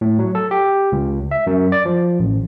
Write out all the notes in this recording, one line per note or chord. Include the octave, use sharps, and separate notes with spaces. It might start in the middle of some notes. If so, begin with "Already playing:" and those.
A2
F#3
A4
G4
C#2
E5
F#2
D5
F3
A1